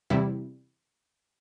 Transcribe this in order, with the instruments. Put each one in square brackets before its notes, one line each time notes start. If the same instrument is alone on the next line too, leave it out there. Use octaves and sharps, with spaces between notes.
[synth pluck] E2 C3 G3 E4